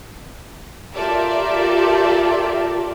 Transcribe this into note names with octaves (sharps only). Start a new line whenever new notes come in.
F4 G4 A4 A#4 D5 E5